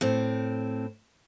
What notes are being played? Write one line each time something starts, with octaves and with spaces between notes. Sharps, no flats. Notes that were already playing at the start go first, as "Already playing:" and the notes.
A2 C4